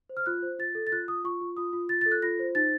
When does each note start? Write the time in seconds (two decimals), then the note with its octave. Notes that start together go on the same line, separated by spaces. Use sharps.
0.09 C5
0.17 F6
0.26 F4 F#6
0.43 C5
0.59 F4 A6
0.75 A4
0.87 A6
0.92 F4 F#6
1.08 F4 D#6
1.24 F4 C#6
1.41 F4
1.57 F4 D#6
1.73 F4
1.89 F4 A6
2.01 A6
2.06 A4
2.11 F#6
2.22 F4 A#6
2.39 C5
2.55 D#4 A6